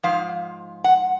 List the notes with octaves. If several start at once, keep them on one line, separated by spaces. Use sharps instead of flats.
G#2 F3 F5
F#5